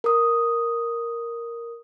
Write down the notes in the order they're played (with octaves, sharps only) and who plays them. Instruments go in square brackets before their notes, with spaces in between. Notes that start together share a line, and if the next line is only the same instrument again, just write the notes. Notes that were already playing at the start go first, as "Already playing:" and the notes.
[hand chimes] A#4 D#6